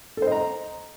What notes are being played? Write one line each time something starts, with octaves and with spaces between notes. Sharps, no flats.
A4 C5 D#5 A#5